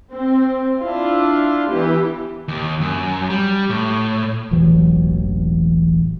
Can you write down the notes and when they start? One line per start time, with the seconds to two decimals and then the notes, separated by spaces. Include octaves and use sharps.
0.12 C4
0.80 D4 E4 F4
1.69 E3 B3 G4
2.48 D#2
2.81 F#2
3.30 G3
3.70 A2
4.51 E1 A1 E3 F#3